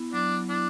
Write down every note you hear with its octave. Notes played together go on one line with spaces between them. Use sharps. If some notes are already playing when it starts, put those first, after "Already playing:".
Already playing: B3 E4
F#3 D4
D4 E4